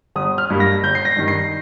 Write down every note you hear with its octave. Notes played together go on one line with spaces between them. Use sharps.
G1 D#6
F6
G2 G3 A#3
A#6
G1 G6
C7
A#6
G2 D#3
C7